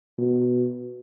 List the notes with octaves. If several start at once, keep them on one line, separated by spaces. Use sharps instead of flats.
B2